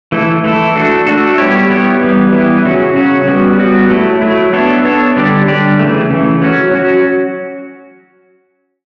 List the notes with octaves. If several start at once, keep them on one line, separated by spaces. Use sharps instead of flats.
E3 A3 E4 A4
E3 A3 E4 A4
A3 D4 F#4 A4
A3 D4 F#4 A4
G3 B3 E4 G4 C#5
G3 B3 E4 G4 C#5
E3 G3 B3 E4
E3 G3 B3 E4
C#3 F#3 C#4 F#4
C#3 F#3 C#4 F#4
G3 B3 F#4
G3 B3 F#4
F#3 A3 E4
F#3 A3 E4
B3 D4 A4 C#5
B3 D4 A4 C#5
D3 G3 D4 G4 D5
D3 G3 D4 G4 D5
C#3 E3 A3
C#3 E3 A3
F#3 C#4 F#4
F#3 C#4 F#4